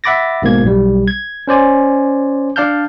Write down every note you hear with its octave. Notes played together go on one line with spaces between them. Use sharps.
E5 F#5 B5 D6 A6 A#6
G#1 G#2 B2 A#3 G#6
B1 G3
G#6
C#4 C5 D5 G#5
D4 D5 F5 A5 F6 G6